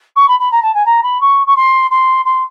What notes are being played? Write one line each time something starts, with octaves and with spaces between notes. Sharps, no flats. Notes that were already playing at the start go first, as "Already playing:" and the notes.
C#6
B5
B5
A#5
A5
G#5
A#5
B5
C#6
C#6
C6
C6
C6